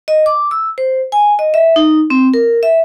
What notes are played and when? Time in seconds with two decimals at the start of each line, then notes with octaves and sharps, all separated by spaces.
0.08 D#5
0.26 D6
0.51 E6
0.78 C5
1.12 G#5
1.39 D#5
1.54 E5
1.76 D#4
2.10 C4
2.34 A#4
2.63 E5